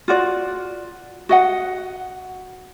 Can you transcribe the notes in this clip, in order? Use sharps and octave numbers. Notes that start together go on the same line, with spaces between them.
F4 F#4 D5
F#4 D#5 F#5